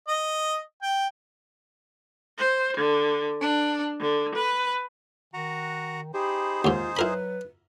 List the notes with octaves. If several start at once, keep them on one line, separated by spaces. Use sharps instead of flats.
D#5
G5
C5
D3
D4
D3
B4
D#3 F#4 F#5 A#5
D#4 G4 G#4 C5 B5
D#2 G#2 F4
F#3 E4 A#4 B4 B5